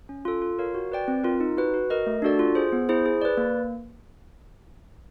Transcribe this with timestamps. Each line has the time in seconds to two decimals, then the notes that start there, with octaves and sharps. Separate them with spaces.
0.09 C#4
0.25 F4 A4
0.42 F4
0.59 A#4 C#5 F5
0.74 F#4
0.92 B4 D5 G5
1.08 C4
1.23 F4 A#4
1.40 D#4
1.57 F#4 B4
1.74 F#4
1.90 A#4 D#5
2.07 A3
2.22 D4 F#4 A4 D5
2.39 F4
2.55 G#4 C5
2.72 B3
2.89 E4 G#4 C5
3.06 G#4
3.22 B4 D5
3.37 A#3